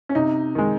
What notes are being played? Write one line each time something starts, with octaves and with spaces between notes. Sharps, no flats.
C#4
C3 D#4
D#3 G#3